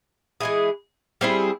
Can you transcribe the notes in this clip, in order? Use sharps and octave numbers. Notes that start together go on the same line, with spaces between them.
E3 G#3 E4 G#4
G3 C4 E4 G#4